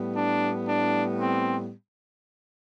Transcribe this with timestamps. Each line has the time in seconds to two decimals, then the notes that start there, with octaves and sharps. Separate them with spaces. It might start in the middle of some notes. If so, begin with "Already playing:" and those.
Already playing: A2 G3 B3
0.16 D4
0.68 D4
1.20 C4